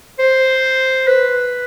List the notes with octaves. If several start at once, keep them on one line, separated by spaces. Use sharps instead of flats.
C5
B4